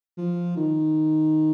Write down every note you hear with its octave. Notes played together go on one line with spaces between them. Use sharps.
F3
D#3